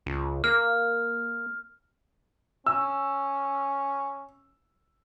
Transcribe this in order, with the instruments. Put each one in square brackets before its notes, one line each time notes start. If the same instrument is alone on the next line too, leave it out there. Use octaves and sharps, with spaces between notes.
[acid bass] C#2
[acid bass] A#3 [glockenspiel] F6
[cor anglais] C#4 [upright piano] E6